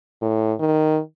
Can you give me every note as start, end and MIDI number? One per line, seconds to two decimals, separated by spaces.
0.22 0.53 45
0.59 0.99 51